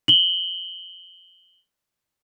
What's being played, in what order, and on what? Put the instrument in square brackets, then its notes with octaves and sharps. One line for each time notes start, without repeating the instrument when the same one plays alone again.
[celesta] F#7 G7